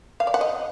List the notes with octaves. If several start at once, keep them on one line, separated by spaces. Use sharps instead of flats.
F5
D5
F#5
D#5